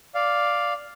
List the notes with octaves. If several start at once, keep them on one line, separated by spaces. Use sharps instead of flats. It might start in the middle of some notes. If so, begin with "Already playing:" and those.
D5 F5